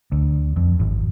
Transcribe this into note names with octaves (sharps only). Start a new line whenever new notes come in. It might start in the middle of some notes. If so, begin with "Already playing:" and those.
D2
F2
G#1